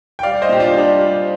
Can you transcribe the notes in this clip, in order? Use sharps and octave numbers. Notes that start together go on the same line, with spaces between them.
G5
G3 D5 F5
C5 D#5
A#2 G4
D4 F4
G3
D4
G3